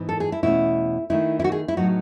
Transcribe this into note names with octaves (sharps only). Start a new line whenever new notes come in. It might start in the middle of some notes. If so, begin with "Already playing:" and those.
Already playing: G#2 E3 B3 D#4
A4
G#4
E4
E2 B2 A3 C#4 E4
D#3 A3 D#4 E4
E4
F#4
G#4
E4
A2 F#3 B3 D#4 F#4